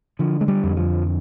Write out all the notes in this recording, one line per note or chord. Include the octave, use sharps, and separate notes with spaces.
D3 F3
G#3
G3
F2
F3